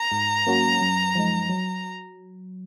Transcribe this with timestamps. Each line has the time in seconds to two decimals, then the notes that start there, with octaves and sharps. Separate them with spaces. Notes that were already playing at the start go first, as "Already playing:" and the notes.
Already playing: A#5
0.12 G#2
0.46 F#3 A#3 C#4 F#4
0.81 F#2
1.15 F3 G#3 D#4
1.49 F#3